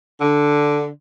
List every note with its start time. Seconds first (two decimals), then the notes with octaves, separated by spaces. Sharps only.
0.20 D3